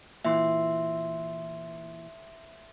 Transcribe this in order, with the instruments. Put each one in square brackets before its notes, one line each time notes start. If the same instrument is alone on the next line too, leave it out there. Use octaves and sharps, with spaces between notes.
[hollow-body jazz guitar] A#2 E3 [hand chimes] E5 C6